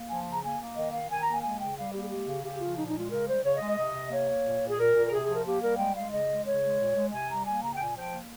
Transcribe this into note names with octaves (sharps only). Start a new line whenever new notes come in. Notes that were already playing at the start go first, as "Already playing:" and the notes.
Already playing: A#3
F3 G#5
C#3
A#5
A#3 G#5
A#3
D#3 D#5
D#3 F5
D#3 G#5
A#5
A#3
G#5
G#3 G#5
C#3 G5
G3 F5
A#3 G4
G#4
G#3 G4
C#3
C#3 G4
F3 F4
A#2 D#4
D#4
G#3 F4
C#3 A#4
G3 C5
C#3 C#5
D#5
G#3
D#5
C3 D#5
C3
A#3 C#5
A#3
A#2
A#2
G#4
A#2 A#4
A#2
A#4
C3 G#4
G#4
F3
A#4
A#3 G4
G3 A#4
G#3 G5
G#3 F5
C#3 D#5
G#3
C#3 C#5
G#3
A#2
G#3
C3 G#5
G3 A#5
A#3 G#5
C#3 A#5
G5
A#2 G#5
F3 G5
A#3